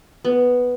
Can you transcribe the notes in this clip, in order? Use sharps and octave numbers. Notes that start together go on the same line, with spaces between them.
B3